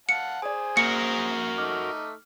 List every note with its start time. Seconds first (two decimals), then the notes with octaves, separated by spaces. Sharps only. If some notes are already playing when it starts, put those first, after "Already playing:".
0.09 F5 F#5 A5 C#7
0.42 G#4 C5 D5 G#5
0.77 A#3 F#4 A#4 C7 C#7
1.58 A3 D#4 D6 F6